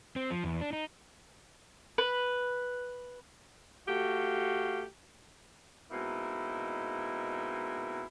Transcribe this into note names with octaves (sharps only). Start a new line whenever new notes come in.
C4
F3
E2
D4
D#4
B4
A3 F#4 G4 F5
B2 G#3 A#3 C4 D#4 E4